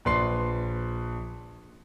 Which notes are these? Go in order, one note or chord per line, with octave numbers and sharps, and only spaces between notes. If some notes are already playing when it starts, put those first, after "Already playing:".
A#1 B4 C6 C7